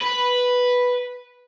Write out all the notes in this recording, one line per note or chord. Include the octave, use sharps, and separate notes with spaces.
B4